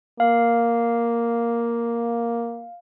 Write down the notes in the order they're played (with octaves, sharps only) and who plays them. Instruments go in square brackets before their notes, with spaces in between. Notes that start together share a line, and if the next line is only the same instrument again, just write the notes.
[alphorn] A#3 [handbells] F5